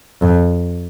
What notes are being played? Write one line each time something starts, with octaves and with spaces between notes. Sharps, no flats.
F2